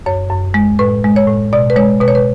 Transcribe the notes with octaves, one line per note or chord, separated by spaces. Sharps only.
F#2 C#5
F#2
G#3
A2 B4
G#3
C#5
A2
B2 D5
B4
G#3 C#5
B2 B4
C#5
B4